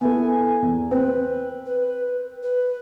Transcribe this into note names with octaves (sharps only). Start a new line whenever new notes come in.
B3 E4 A4 G#5
E2
C4 B4
B4
B4